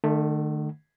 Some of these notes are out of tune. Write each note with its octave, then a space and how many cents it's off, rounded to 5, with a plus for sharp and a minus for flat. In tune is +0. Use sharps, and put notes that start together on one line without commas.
D#3 -45 A3 +0